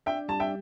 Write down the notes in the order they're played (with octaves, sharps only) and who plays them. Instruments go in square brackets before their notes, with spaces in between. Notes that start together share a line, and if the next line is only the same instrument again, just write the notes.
[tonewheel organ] D4 [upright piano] E5 G5
[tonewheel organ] G3 [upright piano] A5
[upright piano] E5 G5